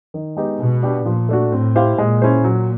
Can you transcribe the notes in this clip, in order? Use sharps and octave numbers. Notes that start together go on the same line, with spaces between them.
D#3
G#3 B3 D#4 G4
B2 G#3
B3 D4 G4 B4
A#2 F3
A3 D4 F#4
A2 C4
E4 G4 C5 F5
A#2 G#3
C#4 E4 G#4 C5
A#2 F#3